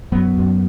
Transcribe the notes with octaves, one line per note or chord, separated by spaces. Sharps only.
F#2 F#3 B3
F#2